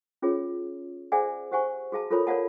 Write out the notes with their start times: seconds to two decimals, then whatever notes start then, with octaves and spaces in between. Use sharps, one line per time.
0.22 C#4 F4 G#4 C#5
1.12 G#4 C5 D5 E5 F#5 G#5
1.51 G4 C5 F#5 G#5 C#6
1.92 F#4 G#4 F5 A5
2.11 F4 A4 A#4 C#5 B5
2.27 A#4 C#5 D5 F5 F#5 A5